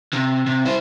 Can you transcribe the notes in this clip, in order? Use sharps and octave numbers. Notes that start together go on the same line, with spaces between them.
C3
C3
E4 C5